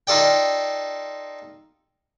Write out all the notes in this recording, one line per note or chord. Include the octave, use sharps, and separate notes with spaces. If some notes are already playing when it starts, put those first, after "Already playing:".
D#4 F4 A4 D5 G5